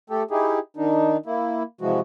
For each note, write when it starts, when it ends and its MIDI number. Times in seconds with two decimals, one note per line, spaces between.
0.10 0.23 57
0.10 0.23 67
0.10 0.23 69
0.31 0.59 63
0.31 0.59 64
0.31 0.59 67
0.31 0.59 68
0.77 1.17 51
0.77 1.17 62
0.77 1.17 63
1.26 1.63 58
1.26 1.63 64
1.81 2.00 48
1.81 2.00 52
1.81 2.00 53
1.81 2.00 56
1.81 2.00 66